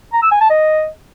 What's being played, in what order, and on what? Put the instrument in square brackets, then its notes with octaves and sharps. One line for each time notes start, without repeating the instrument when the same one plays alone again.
[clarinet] A#5
E6
G#5
A5
D#5